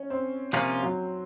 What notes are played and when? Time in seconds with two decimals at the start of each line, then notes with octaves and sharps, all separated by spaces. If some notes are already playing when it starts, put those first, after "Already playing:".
Already playing: C#4
0.10 C4
0.53 C3 F3 A#3 C4 C#4 F4
0.83 F#3